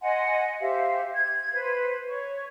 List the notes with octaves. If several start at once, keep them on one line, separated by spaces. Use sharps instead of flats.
D#5 F#5 G#5 C6
G4 C5 E5 F5
G#6
B4 C5
C#5 C#6